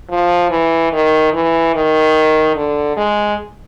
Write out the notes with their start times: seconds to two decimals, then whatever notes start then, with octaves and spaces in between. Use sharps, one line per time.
0.11 F3
0.51 E3
0.93 D#3
1.34 E3
1.75 D#3
2.56 D3
2.97 G#3